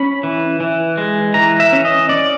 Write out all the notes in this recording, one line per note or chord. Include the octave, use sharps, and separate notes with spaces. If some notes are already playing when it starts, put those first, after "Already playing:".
Already playing: C#4 B5
E3
E3
G#3
E3 A#5
E5
C#4
D#5
C#4 D5